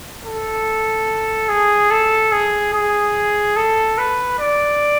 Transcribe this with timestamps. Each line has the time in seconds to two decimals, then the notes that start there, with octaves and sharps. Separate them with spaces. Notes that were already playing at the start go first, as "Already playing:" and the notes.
0.25 A4
1.49 G#4
1.91 A4
2.32 G#4
2.73 G#4
3.56 A4
3.98 B4
4.39 D5